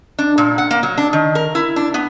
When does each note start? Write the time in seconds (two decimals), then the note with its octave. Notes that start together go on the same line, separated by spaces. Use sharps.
0.19 D4
0.38 A#2
0.58 F#5
0.71 A#3
0.83 F#3
0.97 D4
1.13 D#3
1.35 A#4
1.55 E4
1.76 D4
1.94 B3